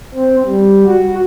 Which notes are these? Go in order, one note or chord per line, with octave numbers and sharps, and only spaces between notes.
C4
G3
F#4